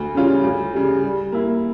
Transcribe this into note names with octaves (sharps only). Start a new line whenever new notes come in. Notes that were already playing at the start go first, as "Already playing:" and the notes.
Already playing: D2
C#3 G3 C#4 F4
D2
C#3 G3
G3
A#3 E4